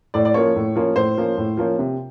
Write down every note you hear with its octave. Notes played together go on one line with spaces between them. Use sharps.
A2 D5
D5
F3 A#3 C#4 C#5
A2
F3 A#3 C#4
A2 C5
F3 A#3 C#4
A2
F3 A#3 C#4
C3